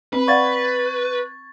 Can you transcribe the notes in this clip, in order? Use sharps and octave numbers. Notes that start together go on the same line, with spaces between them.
C4 B4
D5 F5 F#5 C#6 G#6 A6